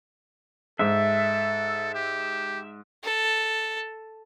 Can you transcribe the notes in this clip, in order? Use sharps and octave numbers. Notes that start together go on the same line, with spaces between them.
G#2 A4 E5
G4
A4